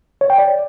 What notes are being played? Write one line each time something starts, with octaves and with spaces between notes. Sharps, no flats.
C#5
G5
D5